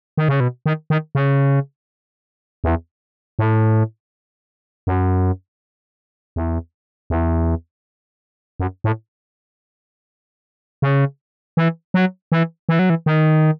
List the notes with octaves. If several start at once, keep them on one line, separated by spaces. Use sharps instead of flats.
D#3
C#3
B2
D#3
D#3
C#3
E2
A2
F#2
E2
E2
F#2
A2
C#3
E3
F#3
E3
E3
F#3
E3
D#3